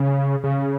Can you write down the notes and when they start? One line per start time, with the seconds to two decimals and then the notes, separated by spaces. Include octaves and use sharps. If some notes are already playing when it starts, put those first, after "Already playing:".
Already playing: C#3
0.44 C#3